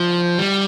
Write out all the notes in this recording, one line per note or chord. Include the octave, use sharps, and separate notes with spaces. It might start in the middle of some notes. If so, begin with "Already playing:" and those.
Already playing: F3 G6
G3